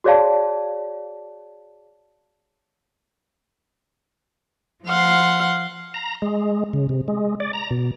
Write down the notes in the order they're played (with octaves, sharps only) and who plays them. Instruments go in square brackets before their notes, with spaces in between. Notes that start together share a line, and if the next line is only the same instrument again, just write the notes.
[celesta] F#4 G#4 C#5 D5 F5 A5
[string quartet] F3 F5 F#5 C6
[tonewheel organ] A#5
G#3
C#3
C3
G#3
D5
A#5
B2